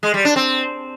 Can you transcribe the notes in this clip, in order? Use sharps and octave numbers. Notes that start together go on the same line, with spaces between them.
G#3
G3
D4
C4